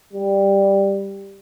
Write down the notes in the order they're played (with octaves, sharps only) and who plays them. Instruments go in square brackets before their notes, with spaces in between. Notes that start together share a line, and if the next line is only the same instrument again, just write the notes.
[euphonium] G3